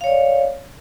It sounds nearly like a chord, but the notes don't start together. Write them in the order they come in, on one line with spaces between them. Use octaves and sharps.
F5 C#5 D5